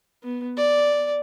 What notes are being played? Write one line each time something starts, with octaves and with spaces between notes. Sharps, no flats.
B3
D5